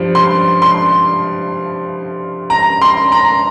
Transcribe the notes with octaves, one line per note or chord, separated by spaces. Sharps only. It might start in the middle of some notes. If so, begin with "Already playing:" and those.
Already playing: G2 F3
C6
C6
A#5
C6
A#5